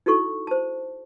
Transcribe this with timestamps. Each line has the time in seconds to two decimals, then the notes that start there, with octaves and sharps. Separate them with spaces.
0.06 D#4 E4 F#4 A4 C#6
0.47 C5 A5